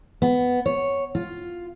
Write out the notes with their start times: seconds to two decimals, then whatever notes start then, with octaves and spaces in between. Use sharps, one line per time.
0.22 B3
0.66 C#5
1.15 F4